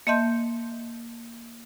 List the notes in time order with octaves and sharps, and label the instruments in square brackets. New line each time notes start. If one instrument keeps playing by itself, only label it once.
[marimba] A#3 D#5 E5 A5 C6 G6